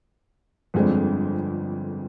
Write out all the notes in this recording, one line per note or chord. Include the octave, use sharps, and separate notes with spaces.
G1 F2 D3 G#3 C4